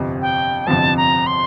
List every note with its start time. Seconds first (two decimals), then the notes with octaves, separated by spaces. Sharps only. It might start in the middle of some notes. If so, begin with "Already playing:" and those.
Already playing: G1 F2 C3 F3 C4
0.22 G5
0.67 G1 F2 C3 F3 C4 A5
0.97 A#5
1.27 C6